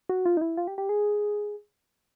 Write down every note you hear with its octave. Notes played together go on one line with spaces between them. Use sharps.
F#4
F4
D#4
E4
F4
G4
G4
G#4